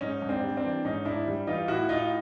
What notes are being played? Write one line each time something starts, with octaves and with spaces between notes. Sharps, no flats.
G#2 C#4 D#4
G#2
C4 D4
G3
C4 D4
E3
G#2 C#4 D#4
G#2 D4 E4
G3
E3 D#4 F4
A2 E4 F#4
A2 D#4 F4